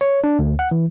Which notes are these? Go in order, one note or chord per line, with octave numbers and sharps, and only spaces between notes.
C#5
D4
D2
F#5
E3